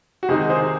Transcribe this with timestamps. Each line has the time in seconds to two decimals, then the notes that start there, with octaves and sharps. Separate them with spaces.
0.23 F#4
0.29 C3 D#3 G#3 D#4 G#4
0.50 G#4 C5